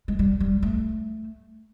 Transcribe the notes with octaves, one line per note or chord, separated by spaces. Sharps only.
G#3
G3
G3
A3